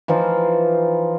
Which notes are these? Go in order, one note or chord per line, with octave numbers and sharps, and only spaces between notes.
E3 F3 D#4 F4